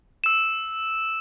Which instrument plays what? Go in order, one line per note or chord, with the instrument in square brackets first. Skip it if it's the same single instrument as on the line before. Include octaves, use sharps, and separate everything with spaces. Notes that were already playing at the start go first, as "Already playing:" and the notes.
[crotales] E6 E7